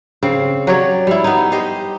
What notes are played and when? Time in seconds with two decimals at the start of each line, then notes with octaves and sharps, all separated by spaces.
0.23 C#3 C4
0.67 F#3 G4 C#5 D5
1.07 G3 E4
1.24 B3 D#4
1.52 G4 C5 D#5